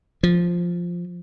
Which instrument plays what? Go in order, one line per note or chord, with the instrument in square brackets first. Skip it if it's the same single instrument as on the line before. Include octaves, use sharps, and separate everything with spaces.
[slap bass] F3